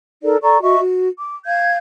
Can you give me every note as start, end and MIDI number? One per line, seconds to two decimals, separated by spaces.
0.23 0.36 63
0.23 0.36 69
0.23 0.36 70
0.23 0.36 74
0.42 0.61 69
0.42 0.61 74
0.42 0.61 82
0.42 0.61 85
0.62 0.79 66
0.62 0.79 75
0.62 0.79 76
0.62 0.79 85
0.79 1.10 66
1.18 1.35 86
1.46 1.76 77
1.46 1.76 91
1.46 1.76 92